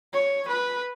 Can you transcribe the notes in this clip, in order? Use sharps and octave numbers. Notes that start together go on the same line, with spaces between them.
C#5
B4